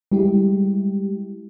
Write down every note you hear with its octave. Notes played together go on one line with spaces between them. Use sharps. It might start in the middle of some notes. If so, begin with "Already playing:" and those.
G3 G#3 E4 G4